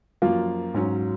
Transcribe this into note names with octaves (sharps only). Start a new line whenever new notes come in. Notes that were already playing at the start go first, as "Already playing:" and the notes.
F#2 F3 A#3 F4
G#2 F#3 C#4